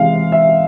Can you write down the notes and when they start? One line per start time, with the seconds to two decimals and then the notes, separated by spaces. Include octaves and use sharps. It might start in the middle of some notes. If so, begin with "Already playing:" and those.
Already playing: C3 E3 G#3 F5
0.32 E5